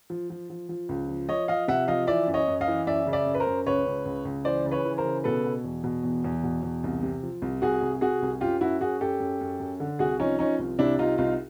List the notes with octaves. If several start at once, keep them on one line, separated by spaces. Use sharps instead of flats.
F3
F3
F3
F3
C#2
F3
F3 C#5 D#5
F3 D#5 F5
C3 E5 F#5
F3 D#5 F5
E3 D5 E5
F#2
C#5 D#5
F#2
D#5 F5
E3
F#2 D5 E5
C#3
D5 E5
F#2
B4
A#4 C5
F#2
C#2 B4 C#5
C#2
C#2
C#2
E3 C5 D5
C#3
B4 C#5
E3
A#4 C5
C#3
B2 A4 B4
B2
E2
B2
E2
E2
B2
E2
C2
C3
F3
C2
C2 F#4 G#4
C2
C3 F#4 G#4
C2
F#2 F4 G4
F#2 E4 F#4
F#2 F#4 G#4
F#2 G4 A4
F#2
F#2
F#2
D3
C2 F#4 G#4
F3 C#4 D#4
F3 C#4 D#4
C2
C3 D4 E4
C2 D#4 F4
C2 D#4 F4